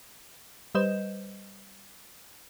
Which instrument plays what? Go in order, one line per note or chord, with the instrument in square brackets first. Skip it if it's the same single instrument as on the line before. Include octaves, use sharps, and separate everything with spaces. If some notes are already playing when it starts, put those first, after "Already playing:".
[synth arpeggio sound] G3 B4 C5 D#5 G6 E7